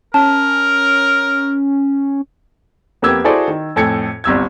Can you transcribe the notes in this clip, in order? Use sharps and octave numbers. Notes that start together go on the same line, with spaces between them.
C#4 A#4 A5
F2 A#3 B3 G4 E6 G#6
E4 F#4 G#4 A4 C5 D5
D#3
F2 A2 A4 G#5 G#6 C#7
G1 C2 E6 G#6